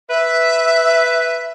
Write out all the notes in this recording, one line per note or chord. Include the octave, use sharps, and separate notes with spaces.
B4 E5